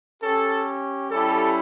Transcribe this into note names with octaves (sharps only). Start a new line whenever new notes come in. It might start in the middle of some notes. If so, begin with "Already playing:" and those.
C#4 G4 A4
G3 C#4 E4 G4 A4